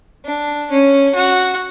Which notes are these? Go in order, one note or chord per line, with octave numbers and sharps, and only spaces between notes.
D4
C#4
F#4